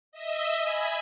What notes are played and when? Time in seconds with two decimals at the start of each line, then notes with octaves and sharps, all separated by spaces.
0.12 D#5 E5
0.61 G#5 B5